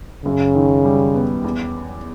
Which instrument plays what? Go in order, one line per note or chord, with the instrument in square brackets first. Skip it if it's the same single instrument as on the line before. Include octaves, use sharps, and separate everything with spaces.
[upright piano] F#2 [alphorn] C#3
[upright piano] D#3
G3
B3
E2